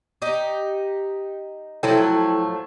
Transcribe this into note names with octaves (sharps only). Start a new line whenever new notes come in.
D#4 G4
F3 F#3 A3 E4 A4 G5